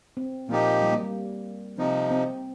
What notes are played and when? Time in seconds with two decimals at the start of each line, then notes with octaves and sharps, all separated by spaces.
0.17 C4
0.49 A#2 F3 A#3 D#4 G4
0.82 G3
0.92 A#3
1.03 G3
1.78 C3 F3 C4 D#4
2.10 C4